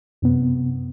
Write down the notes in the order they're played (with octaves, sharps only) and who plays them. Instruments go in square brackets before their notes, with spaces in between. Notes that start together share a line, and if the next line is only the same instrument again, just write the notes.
[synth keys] F#2 C3 B3